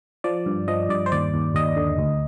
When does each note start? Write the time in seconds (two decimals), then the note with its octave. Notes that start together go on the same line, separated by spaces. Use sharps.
0.24 F3 D5
0.46 G2
0.68 F3 D#5
0.89 G2 D5
1.06 C5
1.12 D#2 D5
1.34 D#2
1.55 D#2 D#5
1.76 D3
1.98 D2